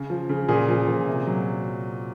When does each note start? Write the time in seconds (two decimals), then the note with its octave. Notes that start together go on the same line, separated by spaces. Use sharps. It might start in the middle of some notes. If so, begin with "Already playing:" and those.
Already playing: C#3
0.10 F3
0.29 C#3
0.48 A#2 G#4
0.68 F3
0.87 A#2
1.07 C3
1.27 F#3